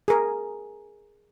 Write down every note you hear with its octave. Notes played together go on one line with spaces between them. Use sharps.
G#4 A#4